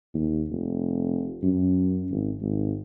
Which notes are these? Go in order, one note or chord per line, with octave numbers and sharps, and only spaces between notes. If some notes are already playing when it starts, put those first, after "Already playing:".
D#2
F1
F#2
G#1
G#1